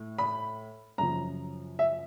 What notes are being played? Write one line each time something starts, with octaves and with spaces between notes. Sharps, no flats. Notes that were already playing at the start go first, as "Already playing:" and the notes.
Already playing: A2
B5
F#2 C#3 F3 A#5
E5